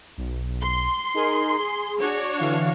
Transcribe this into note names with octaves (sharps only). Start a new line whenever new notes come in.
B1
C6
D#4 G#4 A#4
G#4
D4 F#4 C#5
D3 E3 F5